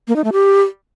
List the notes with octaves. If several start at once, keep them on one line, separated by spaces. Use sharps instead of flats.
A#3
D#4
A3
G4